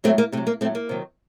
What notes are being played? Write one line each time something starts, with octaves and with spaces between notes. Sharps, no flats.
A2 F#3 A3 C4
A#3
C3 F#3 A3
A#3
A2 F#3 A3 C4
A#3
C3 D#3 F#3